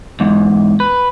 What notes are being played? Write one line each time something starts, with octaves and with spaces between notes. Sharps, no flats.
E2 G#2
B4